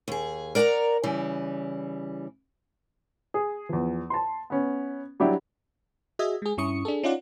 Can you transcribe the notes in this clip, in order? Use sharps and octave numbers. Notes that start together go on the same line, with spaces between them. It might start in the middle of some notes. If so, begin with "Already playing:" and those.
D#2 G#4
A#4 D5 F#5 A5 A#5
C#3 E3 G3
G#4
E2 F3
A5 C6
B3 C#4
F#3 G3 D4 E4 G4 C#5
F#4 G#4 D#5 E5 G#5
G#3 G#4
G2 C#4 E4 C#6 D#6 C#7
D4 G#4 A4
C#4 D#4 F4 D5 F#5